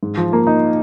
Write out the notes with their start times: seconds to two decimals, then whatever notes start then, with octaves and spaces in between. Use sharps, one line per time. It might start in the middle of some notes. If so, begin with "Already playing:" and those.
0.03 G#2
0.17 F3
0.33 A#3
0.47 D#4